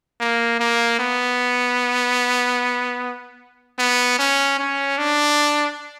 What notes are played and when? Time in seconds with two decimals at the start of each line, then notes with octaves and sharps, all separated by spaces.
0.20 A#3
0.60 A#3
0.99 B3
3.79 B3
4.19 C#4
4.59 C#4
4.98 D4